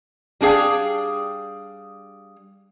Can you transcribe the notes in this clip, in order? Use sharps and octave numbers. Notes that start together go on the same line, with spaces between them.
G3 D4 G#4 F5 G5